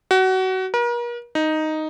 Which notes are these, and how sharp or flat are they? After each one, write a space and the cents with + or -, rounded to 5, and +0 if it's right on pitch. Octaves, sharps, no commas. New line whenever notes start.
F#4 +25
A#4 +40
D#4 +0